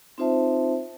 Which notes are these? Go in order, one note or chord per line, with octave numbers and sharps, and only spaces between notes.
C4 D#4 F4 C5 E5 A5